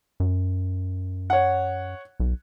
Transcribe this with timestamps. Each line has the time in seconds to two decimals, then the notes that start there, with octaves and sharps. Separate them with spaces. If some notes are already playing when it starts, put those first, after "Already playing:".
0.20 F#2
1.30 C#5 F#5
2.20 B1